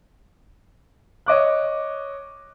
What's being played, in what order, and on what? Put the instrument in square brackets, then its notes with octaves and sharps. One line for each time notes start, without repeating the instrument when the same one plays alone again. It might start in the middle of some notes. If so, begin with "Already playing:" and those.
[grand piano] C#5 D#5 D6 F#6